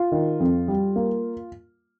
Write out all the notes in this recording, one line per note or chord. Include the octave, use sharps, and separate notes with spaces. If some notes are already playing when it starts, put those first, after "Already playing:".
Already playing: F4
D#3
F2
G3
A#3